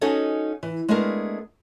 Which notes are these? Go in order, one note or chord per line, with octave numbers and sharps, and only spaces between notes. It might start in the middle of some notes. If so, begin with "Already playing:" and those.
C#4 D#4 F#4 G#4 A4 D#5
E3
G#3 A3 B3 D4 G#4 A#4